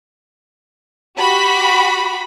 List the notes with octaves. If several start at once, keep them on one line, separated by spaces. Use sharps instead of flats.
F#4 G4 B5